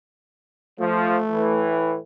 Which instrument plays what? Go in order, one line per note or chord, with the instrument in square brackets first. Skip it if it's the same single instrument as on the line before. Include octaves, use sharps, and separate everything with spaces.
[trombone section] F3 [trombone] A3
[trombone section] A2 E3